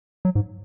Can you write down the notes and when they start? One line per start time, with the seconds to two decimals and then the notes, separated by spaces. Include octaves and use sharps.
0.25 F#3
0.35 G#2